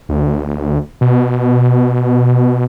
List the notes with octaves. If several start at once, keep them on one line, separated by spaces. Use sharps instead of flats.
D2
B2